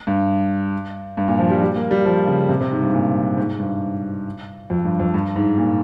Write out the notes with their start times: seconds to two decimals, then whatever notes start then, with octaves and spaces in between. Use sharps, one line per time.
0.07 G2
1.17 G2
1.28 A#2
1.39 F3
1.50 G3
1.62 G3
1.76 A#3
1.91 G3
2.05 F3
2.27 C#3
2.49 C3
2.61 C3
2.72 G#2
2.82 G2
2.94 A#2
3.37 G#2
3.59 G2
4.70 F2
4.84 G2
5.00 F2
5.14 G2
5.36 G#2
5.58 A#2